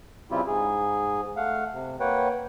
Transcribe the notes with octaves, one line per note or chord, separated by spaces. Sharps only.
C#3 G3 C4 E4 F4 G4
G#2 G#4
A3 F5 F#5
C3
A#3 B4 C#5 F#5 G5